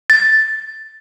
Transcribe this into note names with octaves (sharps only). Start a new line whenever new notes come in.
A6